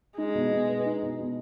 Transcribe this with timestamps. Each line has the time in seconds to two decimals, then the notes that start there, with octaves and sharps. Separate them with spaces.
0.18 G#3 D#4
0.34 B2
0.52 B2
0.68 B3
0.86 D#4
1.02 B2
1.19 B2